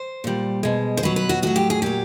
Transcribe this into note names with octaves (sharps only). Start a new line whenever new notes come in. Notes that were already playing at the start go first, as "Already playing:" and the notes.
Already playing: C5
A#2 G3
B2 G#3
C5
B2 F#3 B4
B4
F#4
A2 F#3 F#4
G4
G#4
A#2 F#3 G4